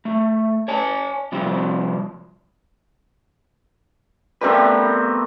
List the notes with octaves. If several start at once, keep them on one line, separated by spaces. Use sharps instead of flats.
A3
C#5 G#5 A5
C3 F3 G3 C4
G3 A3 B3 C4 A#4 B4